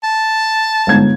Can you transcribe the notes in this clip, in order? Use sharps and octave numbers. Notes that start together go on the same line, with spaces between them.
A5
G1 G#2 G#6